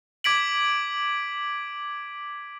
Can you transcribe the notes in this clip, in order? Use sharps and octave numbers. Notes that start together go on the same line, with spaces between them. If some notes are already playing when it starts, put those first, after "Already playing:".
D6 G#6 B6 D7 F#7